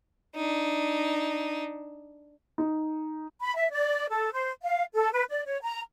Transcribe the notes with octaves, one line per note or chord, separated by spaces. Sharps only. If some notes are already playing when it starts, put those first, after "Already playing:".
D4 D#4
D#4
B5
E5
D5
A4
C5
F5
A4
B4
D5
C#5
A#5